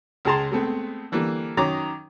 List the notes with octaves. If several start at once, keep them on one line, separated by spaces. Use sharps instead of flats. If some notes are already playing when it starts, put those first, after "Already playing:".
C#2 G#3 G#4 A5 A#5 C6
G#3 A3 B3 C4
D3 E3 G3 A#3
D#3 F#3 C#4 A#5 D6 D#6